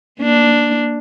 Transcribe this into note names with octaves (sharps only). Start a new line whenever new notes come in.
A#3 D4